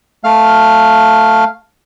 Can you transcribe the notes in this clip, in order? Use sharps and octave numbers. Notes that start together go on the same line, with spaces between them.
A3 F5 F6